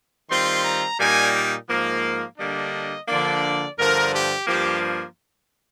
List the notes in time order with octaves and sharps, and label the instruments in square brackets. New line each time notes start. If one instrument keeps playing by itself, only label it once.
[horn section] D#3 G3 C4 F4 C6
A#5
A#2 G3 A#3 D#4 G#5
G#2 F3 A#3
D3 G3 A#3 D4 D#5
D3 F3 A#3 D4 D5
G2 D3 F3 A#4
G4
G2 F3 A#3 G4